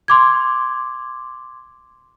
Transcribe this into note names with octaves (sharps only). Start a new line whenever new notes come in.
C6 D6 G#6